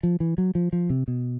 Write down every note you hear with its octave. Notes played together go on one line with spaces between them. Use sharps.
F3
E3
F#3
F3
F3
C3
B2